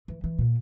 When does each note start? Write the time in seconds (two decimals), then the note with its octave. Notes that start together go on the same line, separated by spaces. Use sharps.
0.08 E3
0.24 E3
0.39 A#2